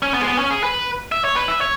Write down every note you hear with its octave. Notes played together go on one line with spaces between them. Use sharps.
C#4
B3
G#3
B3
C#4
G#4
B4
E5
C#5
B4
E5
C#5